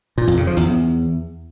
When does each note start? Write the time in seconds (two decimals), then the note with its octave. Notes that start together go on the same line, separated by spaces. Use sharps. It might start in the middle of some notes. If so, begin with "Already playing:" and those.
0.18 A#2
0.27 F2
0.37 C#3
0.47 F3
0.57 E2